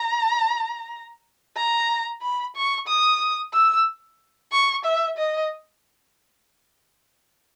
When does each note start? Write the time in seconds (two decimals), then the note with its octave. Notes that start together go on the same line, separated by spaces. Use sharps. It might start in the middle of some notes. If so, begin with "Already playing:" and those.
Already playing: A#5
1.57 A#5
2.22 B5
2.56 C#6
2.88 D#6
3.54 E6
4.52 C#6
4.85 E5
5.18 D#5